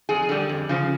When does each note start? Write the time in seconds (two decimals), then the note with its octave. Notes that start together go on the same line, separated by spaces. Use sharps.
0.09 F2 G#4
0.29 D3 G3
0.49 F2
0.69 C#3 F3